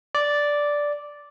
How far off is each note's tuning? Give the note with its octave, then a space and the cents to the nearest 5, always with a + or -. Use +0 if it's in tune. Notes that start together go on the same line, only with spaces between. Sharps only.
D5 -5